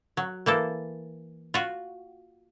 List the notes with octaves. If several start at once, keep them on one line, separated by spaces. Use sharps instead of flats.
F#3
E3 A#3 A4
F4 F#4